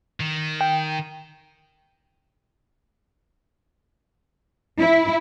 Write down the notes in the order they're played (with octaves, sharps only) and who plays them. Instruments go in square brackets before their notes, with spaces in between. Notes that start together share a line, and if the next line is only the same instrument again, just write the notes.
[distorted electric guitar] D#3
[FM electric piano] G5
[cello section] E4